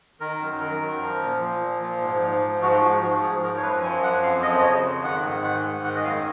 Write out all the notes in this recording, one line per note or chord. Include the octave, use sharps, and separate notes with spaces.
D#3 A#4
F#2
D#3 A#4
F#2
F3
A#2
F3
A#2
F3
G#2
F3
G#2
F3 F#4
G#2 F#4
F3 F#4
G#2 G#4
F3 A#4
C#5
F#2 B4
F3 G#5
F#2 F#5
F2 F5
F3 D#5
D#5
C#3 C#5
F2
D#3 F#5
G#2
D#3 F#5
G#2
D#3 F#5
D#5
F#2 F5